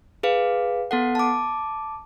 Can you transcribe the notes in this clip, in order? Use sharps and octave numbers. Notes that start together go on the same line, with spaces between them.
G#4 B4 F5
B3 A4 F#5
A5 D6